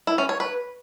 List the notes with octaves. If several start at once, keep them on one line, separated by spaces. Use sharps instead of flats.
E4
C#4
C#5
B4